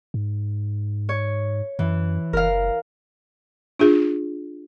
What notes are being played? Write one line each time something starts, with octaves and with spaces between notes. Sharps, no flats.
G#2
C#5
F#2 E3
F#1 A#4 F5
D4 F4 G#4